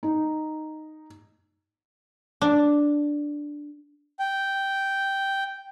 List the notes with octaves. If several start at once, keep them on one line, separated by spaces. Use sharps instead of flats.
D#4
D4
G5